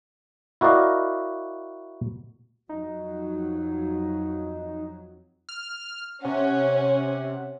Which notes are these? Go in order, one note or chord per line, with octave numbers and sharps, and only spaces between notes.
E4 F#4 A#4 D5 D#5 F5
F2 F#3 D#4
F6
C3 C#4 F#5